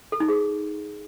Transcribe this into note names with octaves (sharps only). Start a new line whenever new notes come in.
A4
D#4
G#4